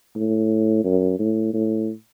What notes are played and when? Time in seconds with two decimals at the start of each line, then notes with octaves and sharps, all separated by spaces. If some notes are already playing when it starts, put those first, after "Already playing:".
0.16 A2
0.84 F#2
1.19 A2
1.54 A2